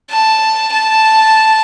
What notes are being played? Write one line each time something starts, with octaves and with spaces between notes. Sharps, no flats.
A5
A5